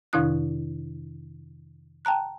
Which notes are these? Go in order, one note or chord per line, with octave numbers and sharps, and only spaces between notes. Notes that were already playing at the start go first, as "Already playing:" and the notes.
F2 C3 D#3 D4 E4 F#6
G5 A5 A#5 F#6